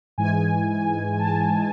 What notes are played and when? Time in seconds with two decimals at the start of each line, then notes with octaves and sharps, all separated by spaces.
0.18 G#2 E3 G#3 G#5
1.19 A5